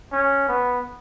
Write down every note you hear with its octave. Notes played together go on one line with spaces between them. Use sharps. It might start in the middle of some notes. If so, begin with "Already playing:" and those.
C#4
B3